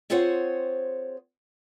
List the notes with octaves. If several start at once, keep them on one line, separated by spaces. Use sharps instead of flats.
C4 F4 G#4 C5 C#5 F#5